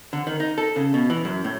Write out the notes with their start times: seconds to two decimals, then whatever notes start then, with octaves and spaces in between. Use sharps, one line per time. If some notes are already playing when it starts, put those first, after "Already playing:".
0.13 D3
0.27 D#3
0.40 D#4
0.58 A4
0.76 C#3
0.94 B2
1.10 E3
1.25 F#2
1.44 A2